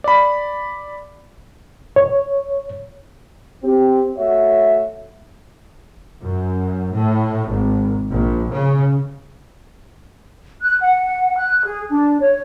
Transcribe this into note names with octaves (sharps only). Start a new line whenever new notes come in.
D5 B5
C#5
C4 G4
A3 F#4 C#5 E5
F#2
A2
G#1
A#1
C#3
F#6
F#5
F#6
G#4
D4
C#5